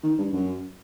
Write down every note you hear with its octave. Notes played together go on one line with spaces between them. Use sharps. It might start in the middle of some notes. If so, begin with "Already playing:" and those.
D#3
G2
F#2